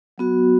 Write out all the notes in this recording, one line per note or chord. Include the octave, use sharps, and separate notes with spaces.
F#3 B3 F#4